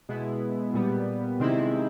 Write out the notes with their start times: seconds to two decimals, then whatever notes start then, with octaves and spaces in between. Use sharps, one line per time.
0.09 B2 G#3 B3 E4
0.74 A#2 G3 B3
1.40 C3 D#3 G#3 C4 E4